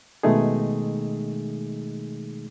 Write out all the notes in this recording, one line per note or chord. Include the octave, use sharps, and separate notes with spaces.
B2 D#3 G#3 A3 D#4 G#4